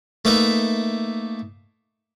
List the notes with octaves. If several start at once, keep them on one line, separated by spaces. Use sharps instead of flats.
A3 A#3 D#4 B4 D#5 E5